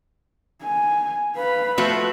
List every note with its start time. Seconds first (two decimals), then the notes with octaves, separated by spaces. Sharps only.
0.63 G#5
1.36 B4 F5 B5
1.78 F3 A3 F#4 E5